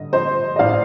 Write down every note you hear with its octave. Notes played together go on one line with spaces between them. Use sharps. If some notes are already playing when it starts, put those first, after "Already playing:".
Already playing: G2 D3 D#5
F3 C5 D#5
D#5
A1 D5 F5